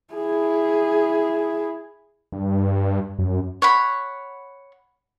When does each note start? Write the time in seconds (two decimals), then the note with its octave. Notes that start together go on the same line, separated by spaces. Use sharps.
0.14 E4 G#4
2.32 G2
3.19 F#2
3.62 C#5 F#5 B5